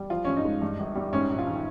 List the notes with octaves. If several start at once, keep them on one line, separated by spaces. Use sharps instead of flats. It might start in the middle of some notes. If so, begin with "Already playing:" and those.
Already playing: G3
F3 F4
G2 C#4
D#4
G#3
G2
G1
G3
G#2 C#4
A#1
F4
D#3